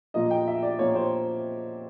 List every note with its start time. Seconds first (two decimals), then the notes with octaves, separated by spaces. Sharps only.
0.14 A#2 F3 A#3 D#5
0.31 G5
0.47 E5
0.63 D5
0.79 A#2 F3 A#3 C#5
0.95 C5